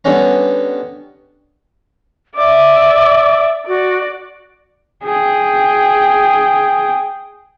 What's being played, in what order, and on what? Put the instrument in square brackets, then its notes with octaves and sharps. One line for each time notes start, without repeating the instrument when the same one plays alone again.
[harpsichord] D3 G3 B3 C#4 A#5
[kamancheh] D5 E5 [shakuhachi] D6
[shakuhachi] F#4 [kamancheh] D5
[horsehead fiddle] G#4 G5